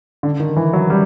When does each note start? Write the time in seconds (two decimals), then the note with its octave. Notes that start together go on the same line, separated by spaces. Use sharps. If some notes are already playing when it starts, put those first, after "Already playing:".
0.23 D3
0.40 D#3
0.57 E3
0.73 F#3
0.90 G3